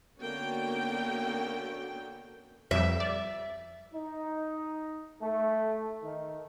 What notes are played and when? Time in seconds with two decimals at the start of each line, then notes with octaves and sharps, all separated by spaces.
0.20 D3 A#3 B3 C#4 F#4 G5
2.71 F2 G3 E5
3.00 D5
3.93 D#4
5.21 A3
6.03 D#3